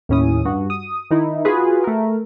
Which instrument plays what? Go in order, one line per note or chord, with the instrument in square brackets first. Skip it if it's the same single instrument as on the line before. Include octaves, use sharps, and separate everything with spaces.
[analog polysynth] D#2 A2 C#4 E4 D#6
G2 F#4
D#6
D#3 D#4 E4
F4 F#4 G#4 B4
A3 A#4